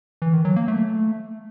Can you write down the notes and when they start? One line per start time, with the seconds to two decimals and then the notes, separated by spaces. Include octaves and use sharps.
0.22 E3
0.33 D#3
0.45 F#3
0.56 A#3
0.68 A3